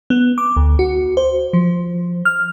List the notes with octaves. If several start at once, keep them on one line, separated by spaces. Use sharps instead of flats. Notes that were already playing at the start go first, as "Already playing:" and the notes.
B3
D6
D2
F#4
C5
F3
F6